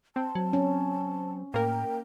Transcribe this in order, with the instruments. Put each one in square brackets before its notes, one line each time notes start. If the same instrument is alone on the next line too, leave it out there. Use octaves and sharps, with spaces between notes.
[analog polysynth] C4 [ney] A5
[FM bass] F#3
[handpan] C#4
[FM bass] A2 [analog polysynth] A#3 A#4 [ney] G5